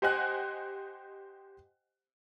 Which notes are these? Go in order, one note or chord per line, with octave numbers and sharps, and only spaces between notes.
G4 C5 D#5 F#5 G#5 F#6